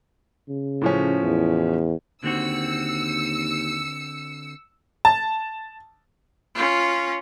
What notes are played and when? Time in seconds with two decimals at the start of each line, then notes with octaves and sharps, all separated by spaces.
0.49 C#3
0.81 A2 F3 C#4
1.23 E2
2.24 D#2 D3 C4 F#4 E6 C#7
5.05 A5
6.55 C#4 F4